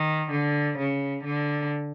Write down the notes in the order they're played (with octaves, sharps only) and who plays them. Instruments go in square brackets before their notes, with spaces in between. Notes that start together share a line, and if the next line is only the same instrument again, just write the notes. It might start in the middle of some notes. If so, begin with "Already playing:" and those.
Already playing: [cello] D#3
D3
C#3
D3